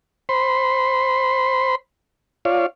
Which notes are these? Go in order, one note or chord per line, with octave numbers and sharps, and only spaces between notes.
C5 B5 C6
F4 C#5 D5 F5